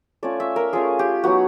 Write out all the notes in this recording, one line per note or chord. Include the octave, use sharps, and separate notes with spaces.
A3 C#4 F4 D5
E5
A#4
A3 C#4 F4 G#4
G4
F#3 B3 D#4 F#4